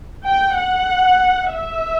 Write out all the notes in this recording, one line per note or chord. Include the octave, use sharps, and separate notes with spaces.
G5
F#5
E5